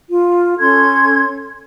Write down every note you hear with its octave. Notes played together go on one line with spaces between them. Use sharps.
F4
C#4 A4 C6 G#6